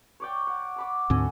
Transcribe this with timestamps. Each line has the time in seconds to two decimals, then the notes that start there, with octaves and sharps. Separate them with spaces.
0.20 C#5 D5 G5
0.47 F#5
0.76 A5 B5 D6
1.10 D2 G#2 C4 A4 D#5 G#5